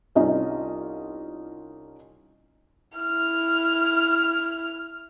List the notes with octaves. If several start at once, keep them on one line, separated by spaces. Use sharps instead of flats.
C2 C#4 D#4 F4 D#5
E4 F6